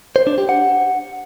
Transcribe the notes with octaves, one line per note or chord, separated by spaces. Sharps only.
C5
D4
G4
F#5